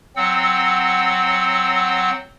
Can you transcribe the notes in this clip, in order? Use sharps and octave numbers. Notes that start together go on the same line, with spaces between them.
F#3 C4 F#5 E6